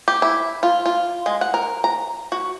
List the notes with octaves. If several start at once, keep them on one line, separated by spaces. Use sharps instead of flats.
G4
E4
F4
F4
G#3
F#5
A#4
A#5
F#4